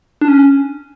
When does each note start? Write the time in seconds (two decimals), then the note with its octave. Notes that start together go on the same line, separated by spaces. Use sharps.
0.21 D4
0.28 C#4